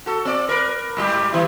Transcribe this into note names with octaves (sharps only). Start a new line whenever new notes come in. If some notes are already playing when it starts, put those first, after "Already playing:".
F#4 A4
C4 D5
A#4 B4
G#2 G3 G4
G2 E3 E4